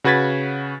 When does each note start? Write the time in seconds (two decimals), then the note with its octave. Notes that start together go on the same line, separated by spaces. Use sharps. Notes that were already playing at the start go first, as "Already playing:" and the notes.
0.04 C#3 F#4 B4 G#6 A6 B6